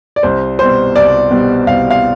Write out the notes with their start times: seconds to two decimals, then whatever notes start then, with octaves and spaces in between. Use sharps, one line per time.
0.16 D5
0.23 C2 C5
0.59 B2 G3 C5
0.96 C2 D5
1.31 B2 G3
1.67 C2 F5
1.91 F5